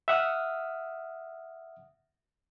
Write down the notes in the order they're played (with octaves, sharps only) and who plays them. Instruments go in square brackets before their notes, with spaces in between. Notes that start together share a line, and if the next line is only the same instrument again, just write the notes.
[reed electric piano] E5 F#5 D#6 F6